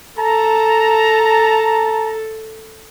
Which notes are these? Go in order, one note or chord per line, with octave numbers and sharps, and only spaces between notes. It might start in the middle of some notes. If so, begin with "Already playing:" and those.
A4 A5 A#5